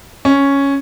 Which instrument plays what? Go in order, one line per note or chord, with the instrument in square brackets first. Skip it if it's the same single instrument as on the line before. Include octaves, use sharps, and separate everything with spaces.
[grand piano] C#4